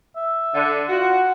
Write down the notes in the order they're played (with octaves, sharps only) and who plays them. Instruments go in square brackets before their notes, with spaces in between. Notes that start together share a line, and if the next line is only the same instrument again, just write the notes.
[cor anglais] E5
[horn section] D3
[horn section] F4 F#4 [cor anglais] F#5